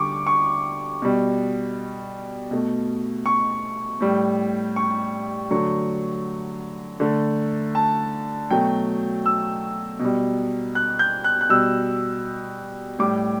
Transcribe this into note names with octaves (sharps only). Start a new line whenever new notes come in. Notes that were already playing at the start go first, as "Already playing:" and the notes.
Already playing: D3 G3 C#6 D6
C#6
B2 G3
B2 A3
C#6
A2 G3
C#6
D3 F#3 A3 C#6
D3 A3
A5
B2 F#3 A3 G5
E6
B2
G3
F#6
G6
F#6
F#6
B2 G3 E6
A2 G3 D6